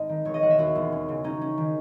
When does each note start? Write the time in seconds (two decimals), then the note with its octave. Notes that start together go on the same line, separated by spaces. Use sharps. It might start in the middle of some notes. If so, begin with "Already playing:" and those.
Already playing: G#1 D#5
0.09 D#3
0.25 E1 C#5
0.34 D#5
0.42 E1 F#5
0.50 E5
0.58 D#2 F#4
0.75 E1
0.92 C#4
1.09 C#3
1.24 C#4 D#4
1.41 C#4
1.58 D#3